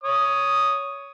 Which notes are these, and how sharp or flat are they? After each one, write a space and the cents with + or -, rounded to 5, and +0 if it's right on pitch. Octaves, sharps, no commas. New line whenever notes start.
C#5 +10 D#6 +0